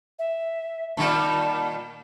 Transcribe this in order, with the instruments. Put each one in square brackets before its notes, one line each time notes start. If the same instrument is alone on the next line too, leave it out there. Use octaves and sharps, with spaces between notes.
[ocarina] E5
[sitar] A#2 D#3 G3 [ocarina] A5